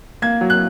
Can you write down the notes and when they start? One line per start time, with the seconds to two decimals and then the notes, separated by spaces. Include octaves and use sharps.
0.22 A#3 G#6
0.41 F#3
0.50 F#6